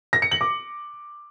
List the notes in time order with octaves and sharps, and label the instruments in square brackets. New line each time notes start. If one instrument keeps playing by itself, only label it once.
[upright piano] A#6
C#7
F#7
D6